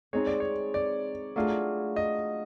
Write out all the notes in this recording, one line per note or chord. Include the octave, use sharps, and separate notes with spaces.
G#3 C4 D#4 G#4 C#5
D5
C#5
D5
F#3 A3 D4 F4 G#4
D#5